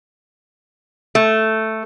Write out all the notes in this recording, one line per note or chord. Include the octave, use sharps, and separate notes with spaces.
A3